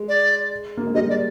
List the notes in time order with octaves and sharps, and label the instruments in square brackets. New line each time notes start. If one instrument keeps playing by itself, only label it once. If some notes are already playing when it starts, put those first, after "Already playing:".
Already playing: [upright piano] G#3
[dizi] D5
[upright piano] A#3
G#3
[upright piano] G3 [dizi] D#5
[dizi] D5